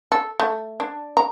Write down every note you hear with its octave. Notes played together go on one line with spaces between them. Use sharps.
A4
A3
D4
A#5